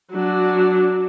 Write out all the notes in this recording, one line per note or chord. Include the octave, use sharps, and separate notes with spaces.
F#3 D4